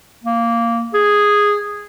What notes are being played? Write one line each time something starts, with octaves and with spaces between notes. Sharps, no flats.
A#3
G#4